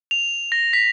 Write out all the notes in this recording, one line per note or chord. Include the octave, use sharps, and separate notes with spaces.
F7
A#6
B6